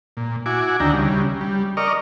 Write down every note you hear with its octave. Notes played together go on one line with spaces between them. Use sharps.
A#2
E4 F#4 G#5 D6
D2 D#3 D4 E4 G5 A#5
C#3 G3
G3
A#4 D5 D#5 C#6 F6